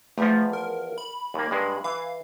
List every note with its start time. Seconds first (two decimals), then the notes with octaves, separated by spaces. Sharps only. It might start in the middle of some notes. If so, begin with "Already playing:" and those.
0.18 E2 F3 A3
0.53 A#4
0.98 B5
1.34 D#2 A#3
1.51 G2 G#3
1.84 E3 F5